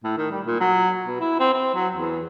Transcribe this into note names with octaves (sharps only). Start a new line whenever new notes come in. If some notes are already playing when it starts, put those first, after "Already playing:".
A2
D#3
G3
A#2
F#3
B2
E4
C4
C4
F#3
E2